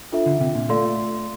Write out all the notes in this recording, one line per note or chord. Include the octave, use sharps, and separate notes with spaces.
D4 F4 A4 E5
D3
C3
A#2
A3 F4 A4 D5 F5 C6